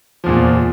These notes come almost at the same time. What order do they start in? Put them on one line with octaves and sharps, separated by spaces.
F3 E2 A#2